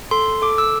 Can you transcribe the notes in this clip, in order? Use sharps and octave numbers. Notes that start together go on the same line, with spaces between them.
A4 C6
A4 D6
E6